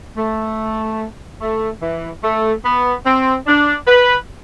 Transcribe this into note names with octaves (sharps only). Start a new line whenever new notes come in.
A3
A3
E3
A3
B3
C4
D4
B4